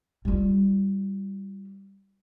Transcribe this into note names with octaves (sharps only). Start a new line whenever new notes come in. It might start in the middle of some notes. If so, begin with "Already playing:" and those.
G3 F4